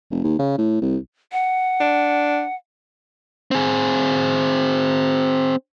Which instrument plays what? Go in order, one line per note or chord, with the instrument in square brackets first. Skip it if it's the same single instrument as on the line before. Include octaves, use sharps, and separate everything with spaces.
[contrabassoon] F1
D#2
C#3
A2
C2
[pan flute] F#5
[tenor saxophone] D4
[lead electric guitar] C4 G#4